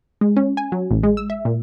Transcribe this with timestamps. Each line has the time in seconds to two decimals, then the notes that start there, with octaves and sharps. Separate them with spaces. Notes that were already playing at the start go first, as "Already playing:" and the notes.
0.21 G#3
0.37 C#4
0.57 G#5
0.72 F#3
0.91 A1
1.03 G#3
1.17 E6
1.30 E5
1.45 A#2